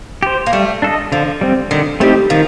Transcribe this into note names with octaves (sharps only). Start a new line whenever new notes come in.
G4 C5
A#3
G3 A3
D4 A4 D#5
D3 F3
G3 C4
D3 D#3
G3 A3 C4 D#4 G4
D#3 F3